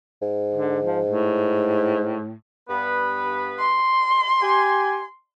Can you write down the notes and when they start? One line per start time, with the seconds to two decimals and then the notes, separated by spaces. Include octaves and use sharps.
0.22 G#2
0.55 D3
0.85 F3
1.09 A2
2.70 G2 B3 B4
3.59 C6
4.42 G4 G#5